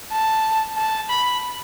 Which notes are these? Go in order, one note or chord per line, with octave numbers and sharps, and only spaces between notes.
A5
A5
B5